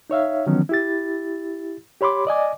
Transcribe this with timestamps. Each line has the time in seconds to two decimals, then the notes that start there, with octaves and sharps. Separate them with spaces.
0.10 D#4 C#5 E5 F5
0.46 D3 D#3 F3 F#3 B3 C#4
0.69 E4 G4 A6
2.01 G4 C#5 B5 C6 D6
2.27 D5 D#5 G#5 D6